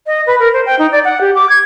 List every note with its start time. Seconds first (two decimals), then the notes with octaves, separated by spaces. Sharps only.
0.07 D#5
0.27 B4
0.40 A#4
0.53 C5
0.66 G5
0.79 D#4
0.92 D5
1.04 F#5
1.21 G4
1.35 D6
1.49 G#6